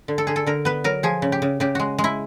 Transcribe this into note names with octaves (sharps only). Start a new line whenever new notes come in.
D3
A4
D3 G#4
A4
D3 A#4
B3 B4
F#3 A#4
F3 G#4
C#3
G4
C#3
C#3 G4
G#3 F#4
G#3
E4